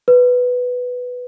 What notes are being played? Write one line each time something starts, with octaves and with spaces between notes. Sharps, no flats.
B4